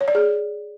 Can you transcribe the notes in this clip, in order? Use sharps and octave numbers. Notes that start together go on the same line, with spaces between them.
C#5
D5
G#4